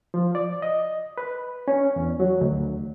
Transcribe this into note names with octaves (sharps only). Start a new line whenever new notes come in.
F3
D5
D#5
B4
C#4
E2
F#3
D2